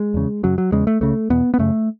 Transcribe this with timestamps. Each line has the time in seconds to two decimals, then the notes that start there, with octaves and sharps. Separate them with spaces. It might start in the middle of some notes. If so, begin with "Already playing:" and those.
Already playing: G#3
0.14 E2 C#3
0.43 F#2 C#3 F#3
0.58 F#3
0.72 E2 C#3 G#3
0.87 A3
1.01 C#2 C#3 A3
1.30 E2 B2 B3
1.54 B3
1.59 F#2 C#3 A3